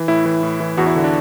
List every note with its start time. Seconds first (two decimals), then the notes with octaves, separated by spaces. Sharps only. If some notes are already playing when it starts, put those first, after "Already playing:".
Already playing: E3
0.08 A2 E4
0.25 E3
0.43 A2
0.60 E3
0.77 E2 F#4
0.87 E4
0.95 D3
1.04 D4